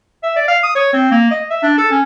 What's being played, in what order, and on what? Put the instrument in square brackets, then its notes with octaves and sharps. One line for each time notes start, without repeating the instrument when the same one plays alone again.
[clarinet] E5
D5
F5
D#6
C#5
C4
A#3
D#5
E5
D4
A4
C#4